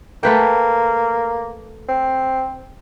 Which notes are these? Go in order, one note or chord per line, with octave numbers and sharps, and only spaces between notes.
A3 A#3 B4 G5
C4